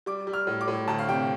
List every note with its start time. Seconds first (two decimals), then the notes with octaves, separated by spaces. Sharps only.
0.06 G3 D6
0.27 G3
0.33 F6
0.47 A2
0.61 D6
0.68 A2
0.88 D2 A5
0.99 F5
1.08 C3 G5